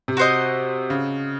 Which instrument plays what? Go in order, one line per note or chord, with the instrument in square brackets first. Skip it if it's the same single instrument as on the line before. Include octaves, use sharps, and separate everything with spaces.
[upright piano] C3
[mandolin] F#4 C5 D#5
[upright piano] C#3